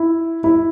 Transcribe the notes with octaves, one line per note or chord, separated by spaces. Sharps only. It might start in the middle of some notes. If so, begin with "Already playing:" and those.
Already playing: E4
E4